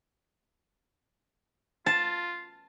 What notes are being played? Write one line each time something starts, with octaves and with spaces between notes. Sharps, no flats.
F4 A5